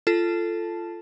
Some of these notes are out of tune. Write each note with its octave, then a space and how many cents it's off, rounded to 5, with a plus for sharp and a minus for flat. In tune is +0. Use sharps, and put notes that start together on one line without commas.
F4 -20 A4 +0 A5 +0